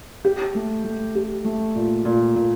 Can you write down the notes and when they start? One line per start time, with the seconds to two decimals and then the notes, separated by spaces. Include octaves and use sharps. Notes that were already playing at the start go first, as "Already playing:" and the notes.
0.25 G4
0.55 A3
0.84 A3
1.15 G4
1.45 A3
1.76 A#2
2.05 A#2
2.35 A#2